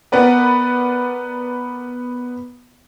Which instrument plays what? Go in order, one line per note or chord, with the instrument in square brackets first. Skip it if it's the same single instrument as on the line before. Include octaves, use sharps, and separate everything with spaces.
[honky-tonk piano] B3 A#4 B4 D5